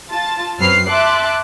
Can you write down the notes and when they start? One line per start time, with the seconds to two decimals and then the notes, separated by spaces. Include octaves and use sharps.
0.11 F4 A5 A6
0.59 F#2 F#3 C4 B4 F6 C7
0.88 E5 A5 C6 D6 F#6